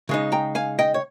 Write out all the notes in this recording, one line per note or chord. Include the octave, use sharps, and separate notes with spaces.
C#3 G#3 D#4
G5 A#5
F5 G#5
D#5 G5
C#5